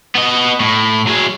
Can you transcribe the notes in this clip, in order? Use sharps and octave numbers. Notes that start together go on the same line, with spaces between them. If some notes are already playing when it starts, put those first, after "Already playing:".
B3 D#5
A2
F#3 G#4